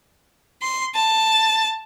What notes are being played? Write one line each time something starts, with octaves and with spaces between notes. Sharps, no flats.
C6
A5